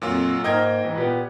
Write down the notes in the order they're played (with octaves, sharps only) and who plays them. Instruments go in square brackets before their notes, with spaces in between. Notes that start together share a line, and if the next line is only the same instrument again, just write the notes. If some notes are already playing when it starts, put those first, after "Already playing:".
[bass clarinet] F2 [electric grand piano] A#2 F#3 F4
[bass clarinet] G#2 [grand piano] A#3 A#5 F6 [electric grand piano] D#5 G5 G#6
[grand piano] G#2 E3
[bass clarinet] A#2 [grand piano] B3 G4 B4